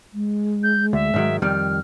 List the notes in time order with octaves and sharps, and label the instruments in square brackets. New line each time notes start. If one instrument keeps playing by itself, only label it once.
[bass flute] G#3
[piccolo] G6
[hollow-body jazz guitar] D2 [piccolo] E5
[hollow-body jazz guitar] G#2 D#3 F#3
[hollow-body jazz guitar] F2 D#3 G3 [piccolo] F6